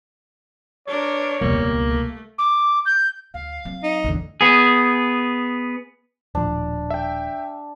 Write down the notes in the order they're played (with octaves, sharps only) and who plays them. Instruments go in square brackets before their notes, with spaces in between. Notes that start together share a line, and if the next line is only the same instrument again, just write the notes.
[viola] D4 A#4 [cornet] C#5
[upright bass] E1 C#2 [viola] G3 [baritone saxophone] A#3
[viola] A3
[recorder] D6
G6
[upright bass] D2 [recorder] F5
[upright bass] F#3 C4
[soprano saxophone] D#4
[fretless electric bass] A1 E2 D3
[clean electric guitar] B3 G#4
[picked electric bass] D#1 A2 F3 [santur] D4
[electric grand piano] E5 G5